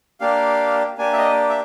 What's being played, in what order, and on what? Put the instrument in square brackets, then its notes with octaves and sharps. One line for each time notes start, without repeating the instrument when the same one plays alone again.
[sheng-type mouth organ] A#3 D4 G4 F5
A#3 D4 G4 G#5
E5
D#5
E5